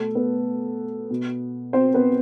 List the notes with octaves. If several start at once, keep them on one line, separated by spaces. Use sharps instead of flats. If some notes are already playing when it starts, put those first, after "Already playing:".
Already playing: B2 A3 A4
B3 B4
B2
C4 C5
B3 B4